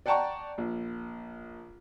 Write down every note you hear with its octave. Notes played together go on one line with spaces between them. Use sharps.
D5 F#5 G5 A5 A#5 C#6
A#1